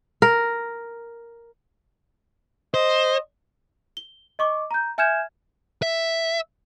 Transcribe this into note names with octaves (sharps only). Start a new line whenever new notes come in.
A#4
C5 D#5
G7
D#5 C#6 D6
A#5 G6
E5 G#5 F6 G6 G#6 E7
E5